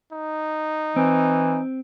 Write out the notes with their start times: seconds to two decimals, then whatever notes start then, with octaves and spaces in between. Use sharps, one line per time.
0.13 D#4
0.96 E3 C4